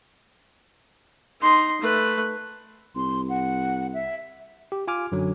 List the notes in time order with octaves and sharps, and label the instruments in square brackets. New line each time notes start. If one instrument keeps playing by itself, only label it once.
[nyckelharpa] D#4 C6
A3 B4
[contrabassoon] C2 [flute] C6
[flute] F#5
E5
[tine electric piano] G4
F4 G#5 D6 F6
F#2 D3 F#3